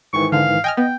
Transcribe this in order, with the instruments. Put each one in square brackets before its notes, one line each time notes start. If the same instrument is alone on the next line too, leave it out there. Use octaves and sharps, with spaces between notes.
[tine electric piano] G#2 D#3 E3 [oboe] C#6
[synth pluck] D3 [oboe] F5
[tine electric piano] D#5 [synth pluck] G5 G#5 F6
[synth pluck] B3 [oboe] G5